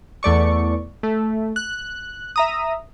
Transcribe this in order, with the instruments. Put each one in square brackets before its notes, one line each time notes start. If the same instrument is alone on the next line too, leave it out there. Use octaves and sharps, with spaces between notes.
[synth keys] E2 A3 D5 C#6
A3
F#6
E5 A#5 D#6